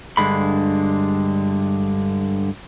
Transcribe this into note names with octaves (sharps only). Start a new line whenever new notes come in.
G2 D3 G#3 B5